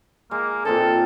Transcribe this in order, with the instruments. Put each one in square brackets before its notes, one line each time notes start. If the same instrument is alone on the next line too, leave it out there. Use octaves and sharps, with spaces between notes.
[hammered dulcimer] G#3 [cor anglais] A#3
[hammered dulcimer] A#2 C4 D#4 [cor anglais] A4